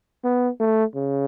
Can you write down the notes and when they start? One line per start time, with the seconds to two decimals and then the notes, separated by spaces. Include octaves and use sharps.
0.24 B3
0.60 A3
0.95 C#3